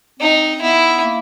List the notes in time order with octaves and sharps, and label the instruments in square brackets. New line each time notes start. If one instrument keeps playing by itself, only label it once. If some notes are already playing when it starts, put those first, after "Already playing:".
[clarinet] C4 [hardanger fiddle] D#4
[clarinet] B3 [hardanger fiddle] E4
[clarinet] A#3